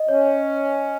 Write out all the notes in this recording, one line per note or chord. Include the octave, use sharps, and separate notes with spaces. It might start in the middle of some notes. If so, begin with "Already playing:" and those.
Already playing: D#5
C#4 C#5
C#5